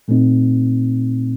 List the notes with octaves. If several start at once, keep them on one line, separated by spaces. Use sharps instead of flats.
A#2 A3 C4 D#4